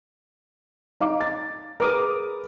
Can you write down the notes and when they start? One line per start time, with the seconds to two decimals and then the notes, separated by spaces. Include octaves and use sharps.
1.00 D#4 F5 D6
1.21 A6
1.80 G#4 A#4 B4 D6 D#6